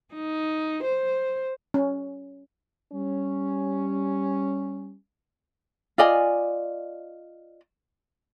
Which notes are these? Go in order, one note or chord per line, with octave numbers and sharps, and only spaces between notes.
D#4
C5
C#4
G3 C#4
F4 D5 D#5 G#5